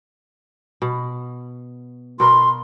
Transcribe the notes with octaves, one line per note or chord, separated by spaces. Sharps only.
B2
B2 A#4 B4 C6